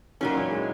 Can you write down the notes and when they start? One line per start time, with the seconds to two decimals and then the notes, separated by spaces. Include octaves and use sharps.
0.21 A#2 D#3 F#3 C#4
0.36 E3
0.51 G#3